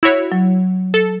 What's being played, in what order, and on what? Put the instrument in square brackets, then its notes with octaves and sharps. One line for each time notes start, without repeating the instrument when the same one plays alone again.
[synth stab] E4 F#4 C#5
[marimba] F#3
[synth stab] A4